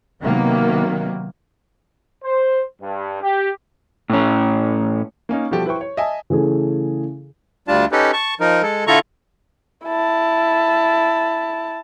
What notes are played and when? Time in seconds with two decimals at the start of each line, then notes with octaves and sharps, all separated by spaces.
0.23 C3 D#3 F#3 A#3 B3
2.24 C5
2.82 G2
3.22 G4
4.10 A2 C#4
5.29 A#3 C#4 D#4
5.51 B2 F3 G3 F#4 G4 A4
5.66 E4 B4 C5 G5 C#6
5.81 C#5
5.97 D#5 E5 G#5 A5
6.30 C#3 E3 A3 G#4
7.68 D2 G3 D4 F4 A5
7.92 C#4 D#4 G4 A4 B4
8.13 A5 C#6
8.40 F3 D#4 A#4
8.62 G#3 A4
8.87 D3 E4 F4 A4 A#5 C#6
9.85 E4 A5